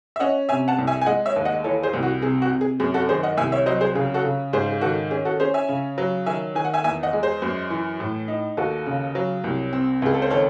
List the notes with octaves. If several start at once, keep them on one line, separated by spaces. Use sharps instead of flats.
E5
C#4 D#5 F#5
C3 E5 G#5
F#5 A5
C2
E5 G#5
G#5
G#3 D#5 F#5
C#5 E5
D#2
D#5 F#5
E3 A4 C#5
G#4 C5
C2
F#4
C3 G#4
F#4
C3
G#4
F#2 G#4
F#4 A4
D#3 G#4 C5
D#5 F#5
C2 E5 G#5
C#5 E5
F#3 C5 D#5
G#4 C5
C#3 G#4
F#4 A4
C#3
G#2 G#4 C5
G#4
D#3 F#4 A4
C#4 G#4
F#4 A4
C#4 G#4 C5
E5 G#5
C#3
F#3
D#3 E5 G#5
D#3 G#5
F#5
E5 G#5
E2 E5 G#5
D#5 F#5
G#3
G#4 C5
F#2
E3
A2
D#4
D#2 F#4 A4
C#3
F#3
C2
C4
C#2 G#4
A4
C5
D#3 A4 C#5